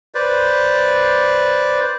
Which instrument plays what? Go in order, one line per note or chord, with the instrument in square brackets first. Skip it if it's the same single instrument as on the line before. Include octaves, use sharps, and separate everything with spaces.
[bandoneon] B4 C5 D5